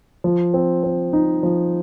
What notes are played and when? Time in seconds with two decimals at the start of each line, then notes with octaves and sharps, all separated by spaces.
0.24 F3
0.54 C4
0.83 C4
1.13 D#4
1.43 F3